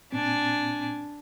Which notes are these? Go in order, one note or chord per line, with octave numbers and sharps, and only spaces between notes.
A#2 C4 D4 G#5